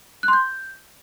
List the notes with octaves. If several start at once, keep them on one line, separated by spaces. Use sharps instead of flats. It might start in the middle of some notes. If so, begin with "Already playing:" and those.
F#6
C6
G6